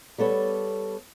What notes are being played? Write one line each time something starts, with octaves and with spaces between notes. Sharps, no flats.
G3 B3 A4 C#5